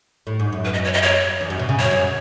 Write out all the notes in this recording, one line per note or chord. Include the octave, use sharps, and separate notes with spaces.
A2
G#2
F#2
B4
D#5
C#5
D#5
C#5
E2
F#2
B2
C#3
F#2 C#5
F#2